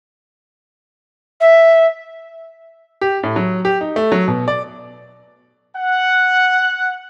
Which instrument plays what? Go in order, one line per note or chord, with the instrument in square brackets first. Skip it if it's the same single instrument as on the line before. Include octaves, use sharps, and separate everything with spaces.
[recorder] E5
[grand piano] G4
A2
F#3
G4
D#4
A3
F#3
B2
D5
[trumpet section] F#5